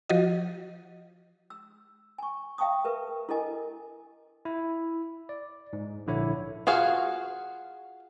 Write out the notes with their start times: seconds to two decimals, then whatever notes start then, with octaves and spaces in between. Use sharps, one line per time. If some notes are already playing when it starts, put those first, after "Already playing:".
0.09 F3 F#4 D#5
1.50 E6
2.18 G#5 C#6
2.58 E5 F5 G5 A5 C#6 D#6
2.85 A#4 B4 E5
3.29 E4 A4 A#4 D#5 G#5
4.45 E4
5.29 D5
5.73 G#2
6.07 A#1 D3 E4 C#5
6.67 F4 F#4 G#4 F5